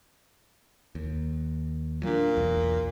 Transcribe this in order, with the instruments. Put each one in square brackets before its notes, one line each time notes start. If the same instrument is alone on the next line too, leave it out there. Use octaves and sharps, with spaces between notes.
[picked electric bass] D#2
[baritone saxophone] A#2 [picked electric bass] F#3 D4
[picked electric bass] E1 B1 E2